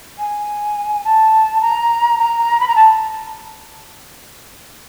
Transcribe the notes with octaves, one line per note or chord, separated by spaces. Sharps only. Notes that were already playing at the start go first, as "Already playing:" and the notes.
G#5
A5
A#5
A#5
B5
A#5
A5